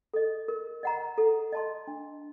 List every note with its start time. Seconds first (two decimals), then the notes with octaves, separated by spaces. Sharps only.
0.14 A4 D#5
0.48 A#4
0.83 D#5 F#5 A#5
1.18 A4
1.52 D#5 A5 C6
1.87 D4